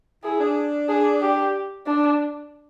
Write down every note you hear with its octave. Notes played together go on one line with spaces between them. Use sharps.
E4 G#4
D4
D4 G#4
G4
D4